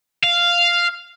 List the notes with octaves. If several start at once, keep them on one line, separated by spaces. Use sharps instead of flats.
F5